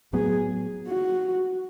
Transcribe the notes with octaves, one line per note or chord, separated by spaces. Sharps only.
A2 F#3 B3 G#4
F#4